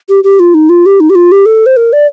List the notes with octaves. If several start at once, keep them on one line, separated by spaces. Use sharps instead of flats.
G4
G4
F4
D#4
F4
G4
D#4
G4
F4
G4
A4
C5
A#4
D5